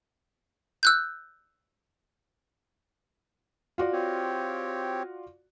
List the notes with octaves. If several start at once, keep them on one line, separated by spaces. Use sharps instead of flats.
E6 F#6 G6
F4 F#4 D5
C4 G4 C#5